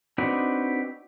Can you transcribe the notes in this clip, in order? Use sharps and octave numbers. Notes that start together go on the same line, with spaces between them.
C4 D4 D#4 F#4 B4